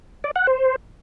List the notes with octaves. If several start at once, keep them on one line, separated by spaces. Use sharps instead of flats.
D5
F#5
C5